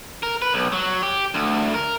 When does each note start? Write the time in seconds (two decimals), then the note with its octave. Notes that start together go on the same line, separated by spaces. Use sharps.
0.23 A#4
0.42 B4
0.54 B1
0.73 F#3
1.03 G4
1.34 D2
1.74 A#4